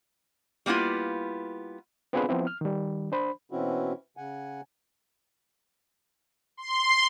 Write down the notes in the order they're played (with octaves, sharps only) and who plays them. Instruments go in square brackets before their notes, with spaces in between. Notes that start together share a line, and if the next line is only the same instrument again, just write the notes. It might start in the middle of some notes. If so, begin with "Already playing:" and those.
[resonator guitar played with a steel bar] G3 A#3 B3 E4 F4
[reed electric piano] B3 C4 D4 F4 G#4 B4
F3 B3 C4 E4
F6
D#3 G3
D4 C5 B5
[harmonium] B2 E3 C4 C#4 E4 F#4
C#3 F#5 G#5
[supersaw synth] C6